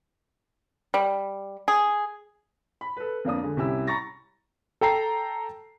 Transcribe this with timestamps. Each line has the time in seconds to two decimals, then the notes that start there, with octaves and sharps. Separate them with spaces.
0.94 G3
1.68 G#4
2.81 B5
2.97 A4 B4
3.25 F2 A#3 D4 D#6
3.43 D3 G#3
3.57 C2 C#4 E4 G4 E6
3.87 A#5 B5 C#6 A6 A#6
4.81 A4 G5 A#5 C7